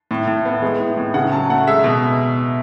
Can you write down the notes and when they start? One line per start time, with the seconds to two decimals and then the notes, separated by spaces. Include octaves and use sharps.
0.11 A2
0.27 A2
0.45 B3
0.62 G#3
0.80 A2
0.97 A2
1.14 C#3 F#5
1.32 F#3 A5
1.50 A3 F#5
1.67 G#3 E5
1.84 B2